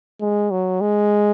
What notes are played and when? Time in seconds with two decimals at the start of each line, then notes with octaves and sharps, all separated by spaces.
0.21 G#3
0.51 F#3
0.81 G#3